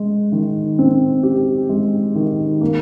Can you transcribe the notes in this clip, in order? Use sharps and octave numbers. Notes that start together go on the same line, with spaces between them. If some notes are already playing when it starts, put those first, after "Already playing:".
Already playing: G#3
D#3
C4
G4
G#3
D#3
A#3